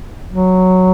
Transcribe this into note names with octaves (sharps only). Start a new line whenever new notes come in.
F#3